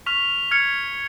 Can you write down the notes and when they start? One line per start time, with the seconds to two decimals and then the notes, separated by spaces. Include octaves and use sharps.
0.06 C#6 F6 B6 F7
0.51 F6 G#6 C#7